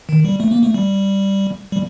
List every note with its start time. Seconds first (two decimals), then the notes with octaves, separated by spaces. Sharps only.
0.09 D#3
0.25 G3
0.40 A3
0.51 A#3
0.63 A3
0.74 G3
1.72 G3